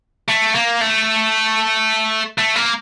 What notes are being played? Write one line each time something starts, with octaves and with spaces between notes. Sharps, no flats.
A3
A#3
A3
A3
A#3